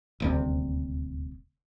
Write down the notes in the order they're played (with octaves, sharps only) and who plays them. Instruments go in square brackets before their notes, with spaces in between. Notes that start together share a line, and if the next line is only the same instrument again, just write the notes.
[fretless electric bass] D#1 D2 C3